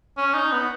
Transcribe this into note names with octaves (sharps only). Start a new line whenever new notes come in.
C#4
D#4
B3